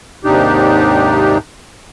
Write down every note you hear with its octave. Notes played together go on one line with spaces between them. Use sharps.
D#2 G#2 C3 D4 D#4 G4